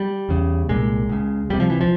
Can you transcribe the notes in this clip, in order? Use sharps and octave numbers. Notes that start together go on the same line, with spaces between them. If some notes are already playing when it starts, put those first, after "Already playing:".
Already playing: G3
E2 C#3
C2 A#2 G#3
C#2 C#3
C#2 C3 G3
F3
E3
F3